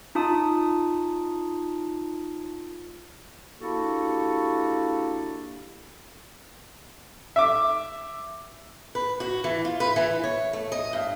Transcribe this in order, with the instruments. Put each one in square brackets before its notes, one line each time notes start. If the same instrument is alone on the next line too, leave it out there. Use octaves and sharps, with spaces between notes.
[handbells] D#4 F4 A5 D#6
[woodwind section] A#3 D4 E4 F#4 G4 A4
[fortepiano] E5 D6
[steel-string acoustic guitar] B4
F#4
E3
F4
B4
E3
C#5
A3
D#5
G2